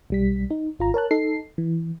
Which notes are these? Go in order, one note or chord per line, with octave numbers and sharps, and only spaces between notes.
B1 G3 B6
D#4
G#1 F4 A#5
A#4 C#5 A5 F#6
D#4 A4 C7
E3